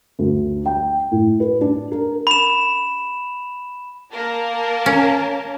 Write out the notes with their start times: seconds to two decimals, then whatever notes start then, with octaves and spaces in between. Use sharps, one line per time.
0.19 D2
0.66 G5
1.11 A2
1.40 B4
1.61 D4
1.92 A#4
2.27 B5 E7
4.12 A#3 A#4 A5
4.86 C#4